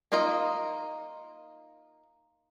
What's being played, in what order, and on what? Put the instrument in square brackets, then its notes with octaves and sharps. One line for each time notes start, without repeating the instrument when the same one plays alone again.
[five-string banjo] A#3 D#4 F4 D#5 A#5